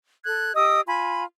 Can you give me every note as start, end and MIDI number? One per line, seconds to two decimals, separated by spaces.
0.25 0.53 69
0.25 0.53 90
0.25 0.53 92
0.55 0.80 67
0.55 0.80 75
0.55 0.80 87
0.55 0.80 88
0.87 1.25 65
0.87 1.25 80
0.87 1.25 83